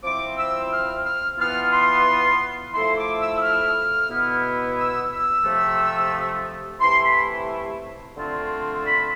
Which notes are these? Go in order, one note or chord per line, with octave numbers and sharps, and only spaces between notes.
F3 C4 E4 D6
E6
F6
F6
E3 B3 F4 F6
C6
F3 A3 E4 C6
D6
E6
E6
F6
B2 B3 E4
E6
E6
C3 F3 A3
C3 E3 A3 E4 C6
B5
D3 A3 C4 F4
B5